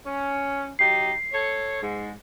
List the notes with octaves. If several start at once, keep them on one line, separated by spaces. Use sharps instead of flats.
C#4
F#3 D#4 G4 C7
A4 C#5
G#2